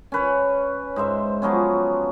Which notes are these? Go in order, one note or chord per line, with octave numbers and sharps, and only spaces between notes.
C#4 B4 C#5
G#2 C5 E5
F3 F#3 B3 C#4